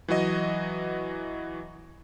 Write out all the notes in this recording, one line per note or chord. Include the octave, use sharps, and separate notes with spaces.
E3 F#3 F#4 D#5